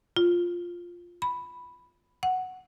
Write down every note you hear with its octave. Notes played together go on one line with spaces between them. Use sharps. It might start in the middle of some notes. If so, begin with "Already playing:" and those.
F4
B5
F#5